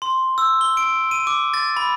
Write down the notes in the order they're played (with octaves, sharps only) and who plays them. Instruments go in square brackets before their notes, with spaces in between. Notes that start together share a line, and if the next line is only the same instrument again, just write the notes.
[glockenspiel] C6
E6
G7
D7
D#7
D6
A6
B5